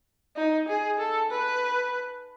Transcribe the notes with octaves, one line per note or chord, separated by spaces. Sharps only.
D#4
G#4
A4
B4